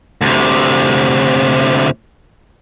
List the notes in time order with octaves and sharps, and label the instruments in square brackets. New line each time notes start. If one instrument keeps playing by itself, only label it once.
[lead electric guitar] D2 C3